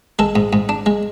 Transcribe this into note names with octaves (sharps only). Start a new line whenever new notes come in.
G#3 A4
G#2
G#2
D4
G#3